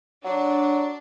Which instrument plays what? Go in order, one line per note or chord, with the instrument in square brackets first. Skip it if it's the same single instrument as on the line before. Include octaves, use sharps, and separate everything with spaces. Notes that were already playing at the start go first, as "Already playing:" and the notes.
[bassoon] F#3 [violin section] D4